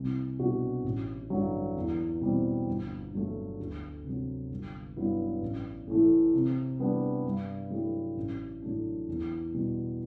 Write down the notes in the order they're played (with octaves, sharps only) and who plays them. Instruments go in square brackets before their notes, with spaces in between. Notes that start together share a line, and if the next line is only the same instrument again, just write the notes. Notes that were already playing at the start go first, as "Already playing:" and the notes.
Already playing: [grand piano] C2
B2 G3 D4 F#4
A1
G2 D3 F#3
E2
B2 G3 C4
G1
G2 F#3 A3
D2
C3
F#3
G1
G2 F#3 B3 E4
A1
A2 E3 A3
C3
G3 B3 D4
G2
F#3 A3 E4 G4
A1
A2 F#3 A3 D4
E2
B2 G3